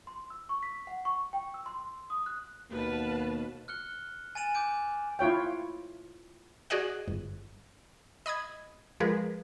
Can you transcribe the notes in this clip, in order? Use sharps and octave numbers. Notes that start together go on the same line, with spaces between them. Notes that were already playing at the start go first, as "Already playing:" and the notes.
C6
E6
C#6
B6
F#5
C#6
G5
E6
C6
D#6
F#6
D#2 B2 B4 F5 A5
F6 F#6 C#7 G7
G#5 A6 D7 E7 F#7
D6 G6 D7
E4 F4 C#5 G5
F#4 G#4 D5 D#5 F#5
G1
D#5 B5 D#6 G#6
F3 G#3 G#4 A#4 B4